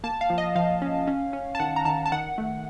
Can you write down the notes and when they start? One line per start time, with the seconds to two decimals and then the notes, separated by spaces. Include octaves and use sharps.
0.04 A#3 A5
0.21 F5
0.30 F3
0.38 D#5
0.55 F3 F5
0.82 C#4
1.07 C#4
1.33 C#4
1.55 A5
1.60 D#3 F#5
1.76 A#5
1.85 D#3 A5
2.06 A5
2.12 D#3 F#5
2.38 A3